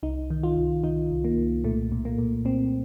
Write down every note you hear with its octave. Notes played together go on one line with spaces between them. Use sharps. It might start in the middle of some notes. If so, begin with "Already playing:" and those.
C2 D#4
D#3
F4
C2
D#3 D#4
C2
A#3
C2
A#2 A3
A#2
A#3
A#2
A#2 C4